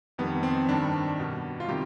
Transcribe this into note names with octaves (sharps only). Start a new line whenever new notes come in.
F2 D#3 G3 B3
C4
G2 D#3 G3 D4
B2 G3
F4
C3 D#3 G3 G4